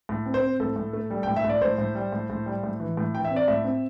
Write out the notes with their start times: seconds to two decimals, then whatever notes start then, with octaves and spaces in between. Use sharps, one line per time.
0.09 A2
0.26 C4
0.34 C5
0.43 C4
0.60 A2 A4
0.76 A2
0.93 A3
1.10 G3
1.23 A2 G5
1.36 E5
1.44 A2 D5
1.61 A2 C5
1.78 A2
1.95 G3
2.13 A2
2.30 A2
2.46 G3
2.63 A2
2.80 E3
2.97 A2
3.14 E3 G5
3.25 E5
3.30 C4
3.36 D5
3.48 A2 E5
3.64 C4